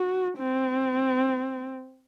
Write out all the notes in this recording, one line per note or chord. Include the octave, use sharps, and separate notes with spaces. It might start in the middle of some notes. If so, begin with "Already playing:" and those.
Already playing: F#4
C4